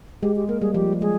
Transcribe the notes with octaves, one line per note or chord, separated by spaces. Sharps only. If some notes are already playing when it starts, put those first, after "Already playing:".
G#3 G4
G4
A#3 A#4
G3 G#4
F3 G4
F3
G#3 G#4